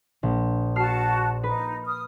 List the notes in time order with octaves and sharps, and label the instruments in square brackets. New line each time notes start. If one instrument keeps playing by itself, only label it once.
[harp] A#1
[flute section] F#4 A5 [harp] F6 C7
[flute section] D#4 [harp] B4
[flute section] D#6 F6